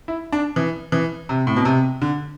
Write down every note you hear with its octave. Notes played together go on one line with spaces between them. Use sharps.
E4
D4
E3
E3
C3
A2
B2
C3
D3